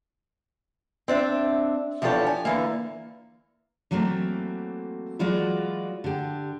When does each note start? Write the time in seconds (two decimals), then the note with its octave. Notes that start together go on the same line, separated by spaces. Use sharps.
1.08 C4 D4 E5
2.02 E2 F3 D4 G4 A4 C#5
2.26 G#5
2.45 D3 E3 A#3
3.91 E3 F#3 A3 A#3 C4
5.19 E3 F#3 G#3 F4 F#4 D5
6.04 D3 G4